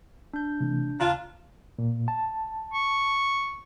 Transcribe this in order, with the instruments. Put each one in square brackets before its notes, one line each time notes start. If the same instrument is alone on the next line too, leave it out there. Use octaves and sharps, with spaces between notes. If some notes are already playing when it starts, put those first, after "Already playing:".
[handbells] D4 G6
[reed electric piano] C3 E3 A3
[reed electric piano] D#2 C#3 A#5 [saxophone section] D4 F4
[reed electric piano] A#2
A5
[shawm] C#6